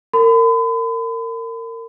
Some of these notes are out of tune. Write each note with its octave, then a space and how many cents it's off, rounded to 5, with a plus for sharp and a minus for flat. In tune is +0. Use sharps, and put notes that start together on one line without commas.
A#4 -30 B5 +40